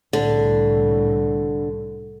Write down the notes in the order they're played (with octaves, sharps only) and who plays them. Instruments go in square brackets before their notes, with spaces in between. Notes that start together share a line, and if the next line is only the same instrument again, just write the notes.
[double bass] C2 A2 [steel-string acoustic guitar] D3